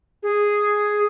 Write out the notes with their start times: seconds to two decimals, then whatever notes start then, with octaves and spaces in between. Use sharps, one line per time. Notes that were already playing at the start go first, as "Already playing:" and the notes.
0.22 G#4